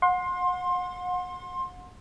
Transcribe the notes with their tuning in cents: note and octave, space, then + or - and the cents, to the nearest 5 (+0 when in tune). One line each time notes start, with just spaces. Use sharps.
F#5 -35 C6 +20